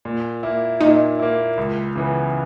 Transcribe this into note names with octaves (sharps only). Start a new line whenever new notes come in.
A#2
A#3 E4
A#2 D#4
A#3 E4
C#2
C#3 E3 B3